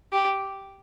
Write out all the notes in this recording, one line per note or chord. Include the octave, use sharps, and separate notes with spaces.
G4